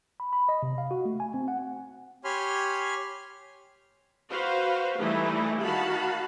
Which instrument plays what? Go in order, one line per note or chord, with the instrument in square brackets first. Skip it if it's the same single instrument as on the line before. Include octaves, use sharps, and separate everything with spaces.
[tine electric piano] B5
B5
D#5
C3
F5
F#4
A3
G#5
C4
F#5
[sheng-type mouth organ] G4 C#5 G#5 B5 C6 F6
[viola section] F#4 B4 C5 F5
E3 G3 A3 D#4 E4
D#3 F#4 F5 A5 B5